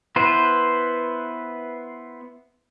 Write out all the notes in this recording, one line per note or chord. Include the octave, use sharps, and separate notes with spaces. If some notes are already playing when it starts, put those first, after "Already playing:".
B3 E4 B4 C5